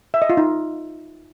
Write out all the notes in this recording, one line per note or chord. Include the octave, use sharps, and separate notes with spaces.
E5
D#5
F4
D#4